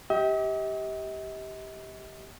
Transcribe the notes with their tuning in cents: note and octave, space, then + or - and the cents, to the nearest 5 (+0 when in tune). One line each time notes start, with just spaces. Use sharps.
G4 -5 D#5 +45